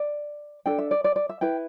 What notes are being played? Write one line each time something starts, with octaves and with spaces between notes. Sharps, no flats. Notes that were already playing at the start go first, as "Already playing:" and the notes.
Already playing: D5
D4 A4 G5
E5
D5
D5
D5
E5
E4 B4 G5